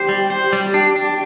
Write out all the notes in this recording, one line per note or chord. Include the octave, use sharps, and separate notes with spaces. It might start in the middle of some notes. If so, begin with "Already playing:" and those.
Already playing: G4 C5
G3
C5
G3
D4 G4
D4